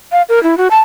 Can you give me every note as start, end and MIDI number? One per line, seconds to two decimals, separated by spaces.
0.12 0.22 77
0.29 0.42 70
0.43 0.57 64
0.58 0.68 66
0.71 0.79 81